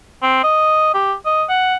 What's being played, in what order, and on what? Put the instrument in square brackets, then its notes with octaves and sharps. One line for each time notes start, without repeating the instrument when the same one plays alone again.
[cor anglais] C4
D#5
G4
D#5
F#5